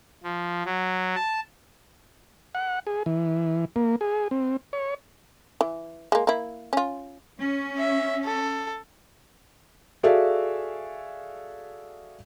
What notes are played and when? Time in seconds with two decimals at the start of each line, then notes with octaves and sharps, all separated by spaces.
0.23 F3
0.65 F#3
1.15 A5
2.55 F#5
2.87 G#4
3.06 E3
3.76 A#3
4.01 G#4
4.31 C4
4.73 C#5
5.61 E3
6.12 G#3 A#3
6.27 A#3 E4
6.73 C#4 F4
7.40 C#4
7.78 E5
8.25 A4
10.03 F#4 G#4 A4 D5 E5 F5